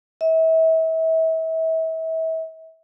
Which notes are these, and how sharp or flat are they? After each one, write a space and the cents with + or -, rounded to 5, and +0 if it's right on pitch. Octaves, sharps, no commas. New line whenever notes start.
E5 -35